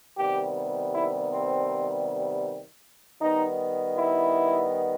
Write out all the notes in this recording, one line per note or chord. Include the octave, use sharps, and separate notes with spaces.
C3 D#3 G3 B3 G4
E4
C4
D#3 G3 B3 D#4
E4